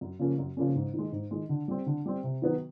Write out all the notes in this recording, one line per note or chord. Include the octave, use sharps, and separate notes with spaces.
F#2
C#3 F3 A#3 C#4
F#2
C#3 F3 A#3 C#4
G#2
D#3 G#3
G#2
D#3 G#3
D3
G3 C4
D3
G3 C4
C3
D#3 F#3 B3